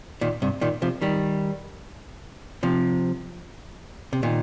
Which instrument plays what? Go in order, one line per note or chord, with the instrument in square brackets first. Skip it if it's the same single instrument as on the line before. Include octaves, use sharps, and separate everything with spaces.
[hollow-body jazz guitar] A#2 D#3
G2 C3
A#2 D#3
C3 F3
D#3 G3
C3 F3
C3
A#2 D#3